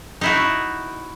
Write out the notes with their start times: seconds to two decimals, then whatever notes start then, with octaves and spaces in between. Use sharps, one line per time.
0.21 D#4 E4 F#4